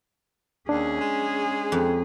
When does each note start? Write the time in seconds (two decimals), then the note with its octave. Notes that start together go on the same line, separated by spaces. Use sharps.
0.69 D#2 C#4 D4 G#4
1.01 G#3
1.72 F2